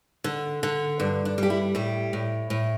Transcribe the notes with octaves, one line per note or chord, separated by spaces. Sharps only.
D3
D3
G2 D4
D4
G3 G4
E4
A2 G4
A2
A2